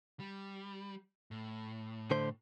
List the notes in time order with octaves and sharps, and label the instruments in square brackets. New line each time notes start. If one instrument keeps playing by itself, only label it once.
[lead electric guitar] G3
A2
[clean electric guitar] D3 A3 C5